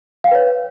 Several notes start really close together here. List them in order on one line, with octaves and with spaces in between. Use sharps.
F5 G5 B4 C#5